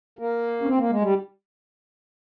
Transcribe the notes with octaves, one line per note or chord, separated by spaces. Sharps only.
A#3
C#4
C4
A#3
G#3
G3